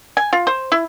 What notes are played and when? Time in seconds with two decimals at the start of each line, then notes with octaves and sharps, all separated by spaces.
0.17 G#5
0.33 F4
0.47 C5
0.72 E4